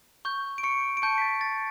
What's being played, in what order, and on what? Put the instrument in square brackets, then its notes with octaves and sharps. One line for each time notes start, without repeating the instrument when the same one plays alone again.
[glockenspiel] C#6 G6
D7
C#6 C#7
D7
A5 C#6 G6 C#7
B6
A6
A6